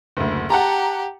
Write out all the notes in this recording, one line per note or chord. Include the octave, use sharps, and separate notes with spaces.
F#1 D2
G4 F#5 A5 A#5